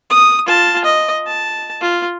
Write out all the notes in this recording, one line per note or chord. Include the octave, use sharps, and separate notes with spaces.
D#6
F4 A5
D#5
A5
F4